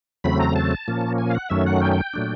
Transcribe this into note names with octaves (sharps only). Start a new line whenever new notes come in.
E2 C#3 F#3 A3 C4 B5
A#5
A5
A#2 F3 A#3 C#4
G#5
F5
F#5
F#2 D#3 F#3 A3 C#4 E5
F#5
G5
A#2 F#3 A3 D4